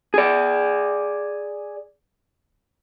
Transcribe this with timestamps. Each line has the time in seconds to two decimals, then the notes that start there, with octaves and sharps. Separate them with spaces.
0.14 G#4 D5